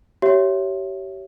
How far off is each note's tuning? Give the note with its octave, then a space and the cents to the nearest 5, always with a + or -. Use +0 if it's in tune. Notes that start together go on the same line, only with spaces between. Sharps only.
G4 -30 C#5 +0 E5 +10